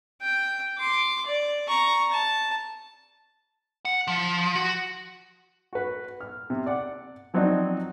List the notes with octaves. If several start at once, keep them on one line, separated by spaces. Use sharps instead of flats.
G5
C6 D6
D5
A#5 C#6
A5
F#5
F3
F#4
F#4 B4
F6
C3
D5 F#5
F3 F#3 C4 D4 D#4